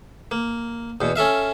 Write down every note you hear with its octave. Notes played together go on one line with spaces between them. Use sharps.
A#3
E2 B2
C#4 A4 E5 F5